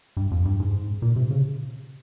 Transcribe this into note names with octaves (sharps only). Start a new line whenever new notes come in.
G2
F2
G2
G#2
A#2
C3
C#3